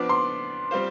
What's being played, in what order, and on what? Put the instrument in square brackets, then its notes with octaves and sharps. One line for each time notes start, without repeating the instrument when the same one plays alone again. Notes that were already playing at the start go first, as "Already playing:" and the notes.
Already playing: [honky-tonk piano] F3 B3 D4 [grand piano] D6
[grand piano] C6
[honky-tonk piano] G3 C4 F4 C5